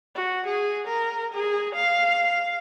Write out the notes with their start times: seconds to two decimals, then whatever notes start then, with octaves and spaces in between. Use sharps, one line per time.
0.15 F#4
0.47 G#4
0.87 A#4
1.34 G#4
1.75 F5